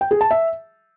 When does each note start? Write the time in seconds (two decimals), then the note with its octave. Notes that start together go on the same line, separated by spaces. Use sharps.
0.01 G5
0.11 G#4
0.21 A5
0.31 E5